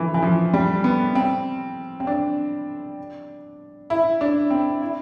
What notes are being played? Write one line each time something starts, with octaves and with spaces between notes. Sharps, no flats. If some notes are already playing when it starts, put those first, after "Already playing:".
Already playing: D3 E3 F3
E3
F3
G3
B3
C4
C4
D4
E4
D4
C4
E4